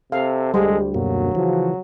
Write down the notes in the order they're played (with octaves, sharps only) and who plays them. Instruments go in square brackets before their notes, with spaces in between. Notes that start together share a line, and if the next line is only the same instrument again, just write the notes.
[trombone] C3 [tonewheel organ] A4 [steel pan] F5
[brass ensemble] D2 [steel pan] G3 C5 [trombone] G#3
[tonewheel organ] F#2 B2 A#3 [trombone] F#3
[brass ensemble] C#3 F3 F#4 [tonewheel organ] E3